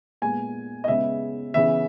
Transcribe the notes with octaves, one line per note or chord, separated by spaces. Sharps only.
A#2 G#3 B3 G#5
D#5
C#3 G#3 B3 E5
C#3 E3 B3 E5